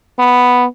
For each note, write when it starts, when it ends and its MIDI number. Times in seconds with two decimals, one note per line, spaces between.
0.19 0.65 59